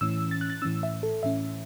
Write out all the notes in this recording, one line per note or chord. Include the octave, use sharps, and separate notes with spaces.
A2 E3 C#4 E6
A6
F#6
A6
A2 E3 C#4 E6
E5
A4
A2 E3 C#4 E5